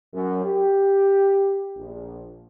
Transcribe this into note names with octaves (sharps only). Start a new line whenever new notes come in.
F#2
G4
A#1